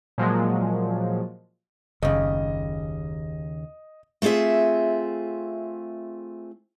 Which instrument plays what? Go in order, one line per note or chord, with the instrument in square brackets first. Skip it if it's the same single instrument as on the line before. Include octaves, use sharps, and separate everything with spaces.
[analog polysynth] A#2 F3 F#3 G#3
[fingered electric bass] F#1 [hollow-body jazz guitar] D#2 C#3 [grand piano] D#5
[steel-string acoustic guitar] A3 C4 F4 G#4 E5